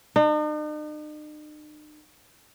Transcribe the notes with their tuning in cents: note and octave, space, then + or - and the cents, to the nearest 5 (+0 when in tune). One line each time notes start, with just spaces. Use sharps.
D#4 -45